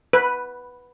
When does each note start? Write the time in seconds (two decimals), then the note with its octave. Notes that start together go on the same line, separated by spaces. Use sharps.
0.13 B4